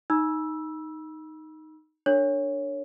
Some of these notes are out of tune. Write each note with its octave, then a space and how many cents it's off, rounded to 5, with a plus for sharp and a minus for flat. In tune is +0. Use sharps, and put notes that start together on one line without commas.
D#4 +0 B5 -35 E6 +0
D4 +0 A#4 -40 C#5 +0